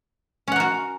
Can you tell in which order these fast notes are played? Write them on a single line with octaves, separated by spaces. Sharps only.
C#4 F#5 A#4 F#4